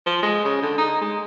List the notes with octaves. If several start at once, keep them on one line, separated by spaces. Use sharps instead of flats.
F3
G#3
C#3
D3
D#4
G#3